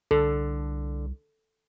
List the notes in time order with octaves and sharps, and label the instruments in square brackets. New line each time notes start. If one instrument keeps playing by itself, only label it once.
[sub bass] C2 [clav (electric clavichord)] D3 [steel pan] A4